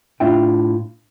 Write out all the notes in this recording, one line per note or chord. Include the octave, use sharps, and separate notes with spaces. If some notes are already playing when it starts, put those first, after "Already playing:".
A2 D4 F4 E5 G5